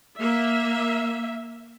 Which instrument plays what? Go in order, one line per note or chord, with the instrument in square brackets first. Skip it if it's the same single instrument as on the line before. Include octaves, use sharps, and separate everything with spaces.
[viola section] A#3 E5